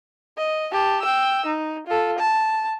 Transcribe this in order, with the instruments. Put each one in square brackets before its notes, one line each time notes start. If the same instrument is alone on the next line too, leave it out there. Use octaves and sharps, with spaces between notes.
[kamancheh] D#5
G4 A5
G5 E6
D#4
F4 A4
A5